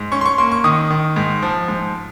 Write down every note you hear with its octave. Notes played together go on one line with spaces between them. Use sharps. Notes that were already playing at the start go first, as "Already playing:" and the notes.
Already playing: G#2
C#4 C#6
C6
C#6
A#3 C6
C#6
D#3 D#6
D#3
G#2
F3
G#2